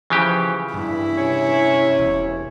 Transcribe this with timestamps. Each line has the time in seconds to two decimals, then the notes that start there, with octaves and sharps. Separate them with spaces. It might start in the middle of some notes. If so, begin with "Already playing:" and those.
0.10 C#3 E3 F3 G4
0.74 G2 E4
1.17 C3 C#4 C#5
1.98 E1